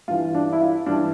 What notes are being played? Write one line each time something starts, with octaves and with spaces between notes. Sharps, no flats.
G2 E3 F4
D4
E4
F4
G2 E3 D4